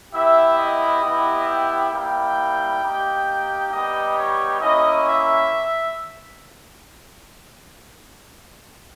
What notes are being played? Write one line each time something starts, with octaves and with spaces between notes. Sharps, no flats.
B3 E4 G4 E5
D#5
B3 E4 G4
G5
G3 A#3 E4 G4 G5
A#3 D#4 G4
G3 B3 D#4 G4 D#5
C#5
A#3 C#4 E4 D#5
E5